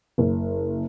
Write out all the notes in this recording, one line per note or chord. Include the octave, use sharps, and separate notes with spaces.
F#1